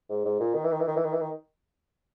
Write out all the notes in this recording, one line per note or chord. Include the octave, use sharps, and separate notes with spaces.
G#2
G#2
A#2
D#3
E3
D#3
E3
D#3
E3
D#3
E3
D#3